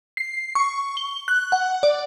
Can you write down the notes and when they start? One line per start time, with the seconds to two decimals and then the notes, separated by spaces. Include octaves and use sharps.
0.17 C7
0.55 C#6
0.97 G7
1.28 F#6
1.52 F#5
1.83 D5